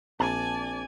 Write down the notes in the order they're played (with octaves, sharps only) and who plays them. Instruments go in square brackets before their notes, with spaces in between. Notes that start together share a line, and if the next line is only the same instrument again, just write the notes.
[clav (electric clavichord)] A#1 [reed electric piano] C4 [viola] D5 G#5 [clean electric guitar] A5